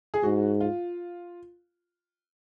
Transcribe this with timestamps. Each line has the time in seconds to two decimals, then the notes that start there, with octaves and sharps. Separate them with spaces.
0.14 G#4
0.23 G#2 F#4
0.61 F4